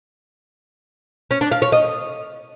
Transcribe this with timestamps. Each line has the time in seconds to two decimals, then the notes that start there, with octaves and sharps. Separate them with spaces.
1.31 C#4
1.41 D4
1.51 F5
1.62 C#5
1.72 D#5